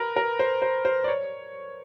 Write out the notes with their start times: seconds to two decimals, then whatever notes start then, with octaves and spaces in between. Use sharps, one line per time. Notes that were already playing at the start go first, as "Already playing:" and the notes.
Already playing: A#4 B4
0.16 A#4
0.39 C5
0.62 C5
0.85 C5
1.04 D5
1.08 C#5